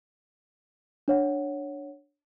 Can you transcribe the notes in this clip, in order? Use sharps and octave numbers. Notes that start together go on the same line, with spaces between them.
D4 C#5 F#5